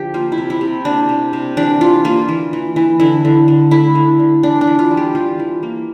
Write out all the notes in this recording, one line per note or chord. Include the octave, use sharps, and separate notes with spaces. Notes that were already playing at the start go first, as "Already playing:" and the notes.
Already playing: D3 F3 G4
A#3 F4
E4
C3
E4
C3
A#3 D4
C3
C3
E3 D4
E3 F4
A#3 F4
E3
E3
E3
D3 E4
D3
D3
A3 E4
D3
D3
E3 D4
D4
E3
F4
G3
G4
E3 F4
E3
A#3